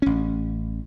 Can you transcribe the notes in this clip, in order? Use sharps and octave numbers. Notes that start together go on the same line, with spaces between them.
A1 C#4